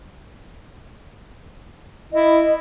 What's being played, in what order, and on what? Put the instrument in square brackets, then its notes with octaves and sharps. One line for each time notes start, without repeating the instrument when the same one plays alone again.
[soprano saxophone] E4 [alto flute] D#5